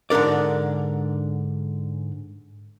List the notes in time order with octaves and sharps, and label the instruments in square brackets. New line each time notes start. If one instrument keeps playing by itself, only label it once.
[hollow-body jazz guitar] G#2 D3 D4 A#4 D5